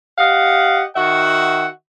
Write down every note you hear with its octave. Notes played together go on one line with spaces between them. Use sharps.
G4 D#5 F5 F#5
D#3 F#4 E5 F#5